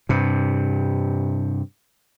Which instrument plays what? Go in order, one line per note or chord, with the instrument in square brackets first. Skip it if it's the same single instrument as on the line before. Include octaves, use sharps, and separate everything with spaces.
[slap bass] G2 C3